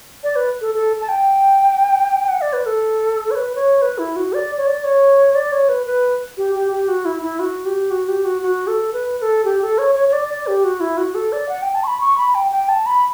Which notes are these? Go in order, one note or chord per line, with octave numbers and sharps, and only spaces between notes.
D5
B4
A4
A4
A5
G5
F#5
D5
B4
A4
C#5
B4
C#5
B4
E4
F#4
D5
C#5
D5
C#5
D5
C#5
B4
B4
G4
G4
G4
F#4
E4
E4
F#4
G4
F#4
G4
F#4
F#4
A4
B4
B4
A4
G4
A4
C#5
C#5
C#5
D5
D5
G4
F#4
E4
F#4
A4
D5
F#5
G5
A5
C#6
B5
C#6
B5
G5
G5
A5
B5